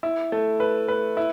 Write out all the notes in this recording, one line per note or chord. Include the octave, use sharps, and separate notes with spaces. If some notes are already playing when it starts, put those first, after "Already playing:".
E4
A3
B4
B4
E4